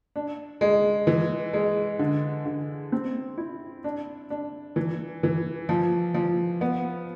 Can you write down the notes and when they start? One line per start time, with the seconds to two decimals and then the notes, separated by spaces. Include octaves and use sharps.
0.16 D4
0.61 G#3
1.07 E3
1.53 G#3
1.99 D3
2.45 D3
2.92 C4
3.38 E4
3.84 D4
4.30 D4
4.76 E3
5.23 E3
5.69 F3
6.14 F3
6.61 B3